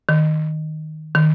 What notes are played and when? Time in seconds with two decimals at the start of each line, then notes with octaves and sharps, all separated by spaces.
0.09 D#3
1.15 D#3